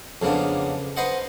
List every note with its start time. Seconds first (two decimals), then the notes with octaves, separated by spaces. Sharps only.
0.22 F2 C#3 A#3 B3 D4
0.97 B4 C5 D#5 F#5